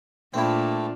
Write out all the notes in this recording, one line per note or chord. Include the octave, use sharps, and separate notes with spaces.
A#2 A3 C4 D4 E4 F4